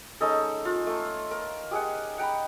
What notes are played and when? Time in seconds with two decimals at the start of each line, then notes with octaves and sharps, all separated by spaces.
0.20 G#3 C#4 D#4 A4
0.65 F4
0.87 A3
1.31 A#4
1.71 G4 G#4 D#5 F#5
2.18 F#5 G5 A#5 B5